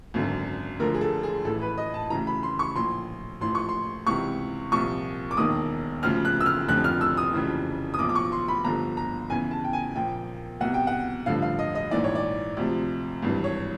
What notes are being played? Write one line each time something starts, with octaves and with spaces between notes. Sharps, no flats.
G#1 F#2 D3
D2 D3 F3 A#4
G#4
A4
G#4
A1 A2 E3 A4
B4
D#5
A5
D2 C#3 E3 A#5
B5
C6
C#6
A#1 A2 F3 C6
A1 A2 F3 C6
C#6
C6
C#2 C3 E3 C#6
C2 A#2 F3 C#6
D6
E1 D#2 D#3 D#6
D2 C#3 F3 F6
F#6
E6
F6
F1 F2 D3 F3 F#6
F6
E6
D#6
F1 F2 C#3 E3
D#6
B1 A#2 F3 D6
D6
C#6
C6
B5
G1 G2 D3 F3 A#5
A#5
E2 C#3 E3 G#5
A5
G5
G#5
A#1 A#2 F3 G5
C2 B2 F#5
G5
F#5
A1 G2 D3 F3 F5
F5
D#5
D#5
A#1 G#2 E3 D5
C#5
D5
D2 C3 F3
G#1 G2 E3
C#5